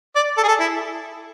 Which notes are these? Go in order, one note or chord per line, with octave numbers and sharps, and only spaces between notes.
D5
A4
G#4
A4
E4